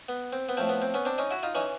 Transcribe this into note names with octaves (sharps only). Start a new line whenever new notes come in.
B3
C4
B3
A2 F3 C4
B3
C4
B3 C#4
C4 D4
C#4 D#4
E4 F#4
D#4 F4
E3 C#4 D#4